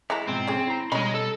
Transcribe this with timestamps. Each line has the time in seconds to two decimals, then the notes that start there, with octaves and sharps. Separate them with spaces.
0.10 E3 G#3 E4 A#5
0.28 G#2 B2 F3 C4
0.47 C#4 G#4
0.67 E4 A#5
0.92 B2 G3 C#4 D#4 D#5 B5 C6
1.14 A4